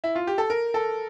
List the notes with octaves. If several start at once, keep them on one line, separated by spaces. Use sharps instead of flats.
E4
F4
G4
A4
A#4
A4